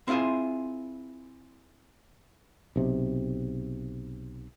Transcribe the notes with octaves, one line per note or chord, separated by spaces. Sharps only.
C4 E4 F4 G#4 E5
B1 C3